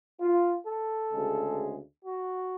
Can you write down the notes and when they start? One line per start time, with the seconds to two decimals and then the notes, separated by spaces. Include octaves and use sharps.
0.21 F4
0.67 A4
1.13 D2 C#3 G#3
2.05 F#4